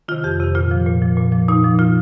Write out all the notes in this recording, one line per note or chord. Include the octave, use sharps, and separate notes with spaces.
C3 D#3 F4
F2 G4
C3 D#3
A#2 F4
F3
A#2
F3
A#2
F3
A#2 D#4
F3
A#2 F4